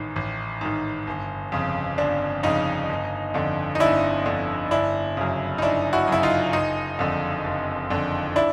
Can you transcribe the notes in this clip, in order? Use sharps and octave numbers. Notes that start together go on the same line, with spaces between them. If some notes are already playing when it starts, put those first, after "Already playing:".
Already playing: A1 G#2 D#3
A1
G#2 D#3
G1
F2 C#3
G1 D4
F2 C#3 D#4
G1
F2 D3
D#4
G1 D4 E4
F2 D3
G1 D4 E4
F#2 C#3
D#4
G1 D4 E4
E4 F#4
F#2 C#3 E4
D#4 F4
F#1 D#4
F2 D3
F#1
F2 D3
D4 E4